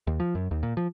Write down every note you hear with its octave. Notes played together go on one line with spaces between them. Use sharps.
D#2
F3
F#2
D#2
A#2
F3